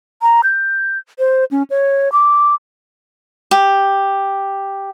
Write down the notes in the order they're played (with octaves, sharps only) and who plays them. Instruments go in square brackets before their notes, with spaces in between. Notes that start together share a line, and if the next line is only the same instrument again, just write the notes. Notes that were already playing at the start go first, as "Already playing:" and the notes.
[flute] A#5
G6
C5
C#4
C#5
D6
[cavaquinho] G4